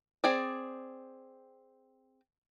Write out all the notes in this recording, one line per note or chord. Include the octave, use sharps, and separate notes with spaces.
C4 G#4 D5